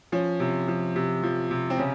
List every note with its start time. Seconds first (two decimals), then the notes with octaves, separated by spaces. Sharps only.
0.12 F3 C#4
0.40 C3
0.68 F3
0.96 C3
1.23 F3
1.51 C3
1.70 C4
1.78 C#3 C#4